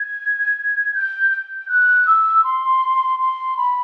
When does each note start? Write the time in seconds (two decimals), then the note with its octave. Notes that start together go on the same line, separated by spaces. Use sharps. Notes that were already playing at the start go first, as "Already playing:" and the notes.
Already playing: G#6
0.94 G6
1.31 G6
1.69 F#6
2.07 E6
2.44 C6
3.20 C6
3.57 B5